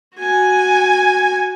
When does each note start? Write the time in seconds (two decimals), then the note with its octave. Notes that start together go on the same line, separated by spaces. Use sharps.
0.17 F#4 G#5